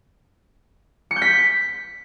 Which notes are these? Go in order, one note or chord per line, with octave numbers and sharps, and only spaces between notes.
C#7
G6
B6